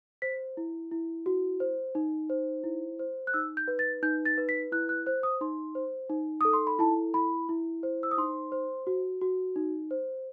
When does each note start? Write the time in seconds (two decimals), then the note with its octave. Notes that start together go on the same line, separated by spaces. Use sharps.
0.22 C5 B6
0.57 E4
0.91 E4
1.26 F#4
1.60 C5
1.95 D#4
2.30 C5
2.64 E4
2.99 C5
3.27 F#6
3.34 D#4 E6
3.57 G6
3.68 B4
3.79 A6
4.02 D#4 G6
4.25 A6
4.38 B4
4.49 B6
4.72 E4 F#6
4.89 F#6
5.06 C5 F#6
5.23 D#6
5.41 D#4 C6
5.75 C5
6.10 D#4
6.41 A4 D#6
6.53 C6
6.67 B5
6.79 E4 A5
7.14 E4 B5
7.49 E4
7.83 C5
8.03 E6
8.11 D#6
8.18 D#4 C6
8.52 C5
8.87 F#4
9.21 F#4
9.56 D#4
9.91 C5